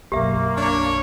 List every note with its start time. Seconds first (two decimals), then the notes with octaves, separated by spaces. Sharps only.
0.12 B1 F#2 A#3 G4 E5
0.56 D4 C#5